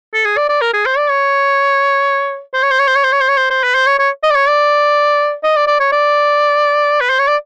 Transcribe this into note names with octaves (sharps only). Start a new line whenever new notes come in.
A4
G#4
D5
D5
A#4
G#4
C5
D5
C#5
C5
C#5
C5
C#5
C5
C#5
C5
C#5
C5
C#5
C5
C5
B4
C5
C#5
C#5
D#5
D5
C#5
D5
D#5
D5
D5
C#5
D5
B4
C5
C#5
D5